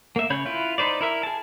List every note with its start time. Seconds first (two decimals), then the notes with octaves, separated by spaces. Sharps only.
0.16 A#3 E5
0.30 C#3 C#5 B5 G6
0.46 E4 F4 B4
0.78 D#4 B4 C5 D5
1.01 E4 A#4 E5
1.23 G#4 A5